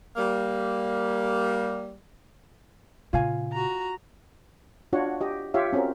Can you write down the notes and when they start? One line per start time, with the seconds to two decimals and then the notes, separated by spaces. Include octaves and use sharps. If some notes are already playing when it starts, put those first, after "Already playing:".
0.17 G3 A#3
3.13 A#2 C#3 F4 F5 G#5
3.53 F#4 A#5
4.93 D4 F4 F#4 C#5 F#5
5.21 G4 D#5
5.54 F4 G4 C#5 E5 F5
5.73 C4 C#4 F4 F#4 A#4